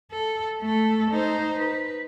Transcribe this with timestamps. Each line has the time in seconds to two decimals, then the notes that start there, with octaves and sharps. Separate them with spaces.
0.12 A4
0.61 A3 A4
1.11 D#4 C5
1.59 B4